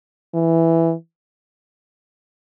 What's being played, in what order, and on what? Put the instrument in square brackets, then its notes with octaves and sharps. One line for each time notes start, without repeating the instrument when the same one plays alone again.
[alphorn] E3